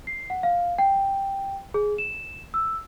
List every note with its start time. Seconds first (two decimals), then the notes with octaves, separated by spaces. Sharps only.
0.07 C7
0.30 F#5
0.43 F5
0.78 G5
1.74 G#4
1.98 E7
2.54 E6